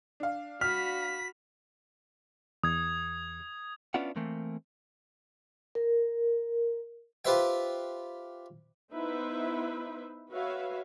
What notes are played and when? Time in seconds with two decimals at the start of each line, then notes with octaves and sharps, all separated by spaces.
0.20 D4 F5
0.61 F#4 B5 F6 B6
2.63 E2 D#6 G#6
3.94 B3 C#4 D4 E4 F4 F#5
4.16 E3 A3 A#3 C4
5.75 A#4
7.25 F4 G4 B4 C5 E5 G5
8.93 B3 D#4 E4 B4 C5 E5
10.30 F#4 B4 C#5 E5 F5